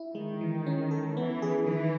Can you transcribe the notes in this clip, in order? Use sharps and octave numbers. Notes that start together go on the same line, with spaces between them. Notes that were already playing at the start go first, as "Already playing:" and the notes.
Already playing: E4
D#3 G#3
E3
C#4
A4
E3 B3
G#4
D#3 E3